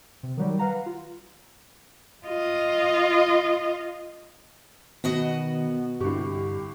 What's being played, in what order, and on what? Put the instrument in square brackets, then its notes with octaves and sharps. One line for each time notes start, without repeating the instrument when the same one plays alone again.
[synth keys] C3
D#3 F#3 G3
B4 F5 F#5 A#5
F4
[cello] F4 D#5
[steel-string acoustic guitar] B2 F#4 D#5 [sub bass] D#3 [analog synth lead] B3
[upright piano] C2 D3 C#6 [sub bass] G2 [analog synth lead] G4